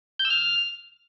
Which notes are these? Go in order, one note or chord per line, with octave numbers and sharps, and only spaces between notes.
G6
E6
F6